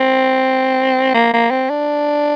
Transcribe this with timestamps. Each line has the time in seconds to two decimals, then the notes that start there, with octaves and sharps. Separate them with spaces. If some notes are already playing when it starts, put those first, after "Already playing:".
Already playing: C4
1.14 A#3
1.33 A#3
1.50 C4
1.69 D4